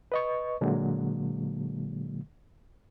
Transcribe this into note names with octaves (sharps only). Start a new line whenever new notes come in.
B4 D#5 C#6
A#2 D3 F#3 G#3 A#3